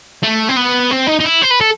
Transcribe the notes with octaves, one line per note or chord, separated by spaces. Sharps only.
A3
C4
B3
C4
D#4
D#4
E4
C5
B4
A4